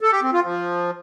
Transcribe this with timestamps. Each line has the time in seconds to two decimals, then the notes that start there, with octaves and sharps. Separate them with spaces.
0.01 A4
0.12 G4
0.22 C4
0.33 F4
0.44 F3